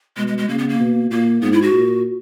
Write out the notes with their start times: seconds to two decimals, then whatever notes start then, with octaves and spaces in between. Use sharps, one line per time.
0.17 B2 G#3
0.28 G#3
0.38 G#3
0.48 C#3 A#3
0.58 B3
0.69 A#3
0.80 B2
1.10 A#2 A#3
1.42 G#2 B3
1.53 E4
1.62 F#4
1.73 A#2